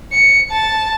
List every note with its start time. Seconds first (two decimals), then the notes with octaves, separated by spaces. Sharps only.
0.13 C#7
0.51 A5